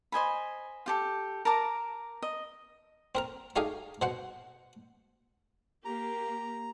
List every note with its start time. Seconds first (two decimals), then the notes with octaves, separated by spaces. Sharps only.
0.12 C5 D#5 G#5 B5
0.86 F4 G4 A4
1.45 A#4 A5 A#5 D6
2.22 D#5
3.15 C4 A#4 A#5
3.56 A3 D#4 G4 G#4 D#5 F5
4.02 B2 C5 F#5
5.85 A#3 G4 A#5